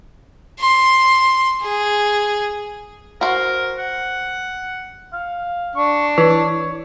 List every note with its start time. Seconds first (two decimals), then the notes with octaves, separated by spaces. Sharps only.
0.60 C6
1.63 G#4
3.21 F#4 A#4 C5
3.78 F#5
5.13 F5
5.76 D4 C#6
6.18 E3 C#5